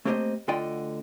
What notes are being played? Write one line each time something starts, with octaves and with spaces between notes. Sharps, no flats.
A3 A#3 C4 G4 C5 D#5
D2 D3 F4 D5 D#5 G5